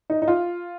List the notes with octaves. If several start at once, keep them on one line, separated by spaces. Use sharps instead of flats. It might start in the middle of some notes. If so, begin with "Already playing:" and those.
D#4
D#4
F4